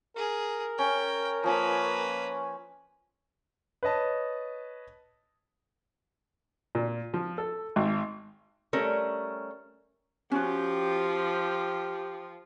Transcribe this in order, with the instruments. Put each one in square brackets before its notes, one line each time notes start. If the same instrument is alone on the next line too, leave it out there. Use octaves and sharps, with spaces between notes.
[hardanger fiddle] G#4 [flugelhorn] A#4
[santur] C#4 [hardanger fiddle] G5
[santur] F3 C#4 [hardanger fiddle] A#3 B4
[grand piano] B4 C#5 D#5 A5
[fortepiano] A#2
F3
A4
G#1
[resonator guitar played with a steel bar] G3 A3 C#4 A#4
[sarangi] F3 [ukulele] C#4 F#4 [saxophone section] G4